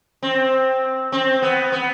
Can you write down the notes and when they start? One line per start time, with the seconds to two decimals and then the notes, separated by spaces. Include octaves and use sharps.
0.23 C4
1.12 C4
1.42 B3
1.72 B3